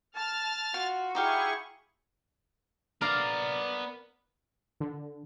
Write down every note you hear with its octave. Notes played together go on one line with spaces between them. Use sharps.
A5 F6 A6
F4 F#4
D#4 E4 G4 G#4 F5 C#6
B3 A#4 D5 F5 A#5
D3